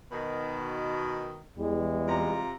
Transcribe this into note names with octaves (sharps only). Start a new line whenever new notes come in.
B2 D#3
E2 E3 G3 G#3
C3 F4 A#5